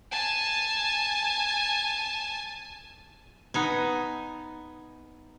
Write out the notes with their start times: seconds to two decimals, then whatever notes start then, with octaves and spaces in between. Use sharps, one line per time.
0.11 G#5 A5
3.54 B3 D#4 G#5